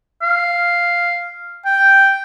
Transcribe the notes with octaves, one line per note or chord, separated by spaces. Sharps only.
F5
G5